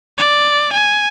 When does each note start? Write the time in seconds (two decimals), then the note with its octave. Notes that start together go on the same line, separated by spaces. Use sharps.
0.18 D5
0.72 G#5